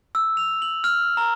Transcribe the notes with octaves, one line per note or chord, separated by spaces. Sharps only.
E6
F7
F#7
F6
A#5